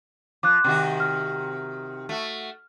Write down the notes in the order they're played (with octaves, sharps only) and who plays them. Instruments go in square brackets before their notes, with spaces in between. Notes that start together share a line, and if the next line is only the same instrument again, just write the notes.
[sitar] F3 [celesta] D6 F#6
[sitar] C3 D#3 F#4
[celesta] F6
[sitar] A3 F#4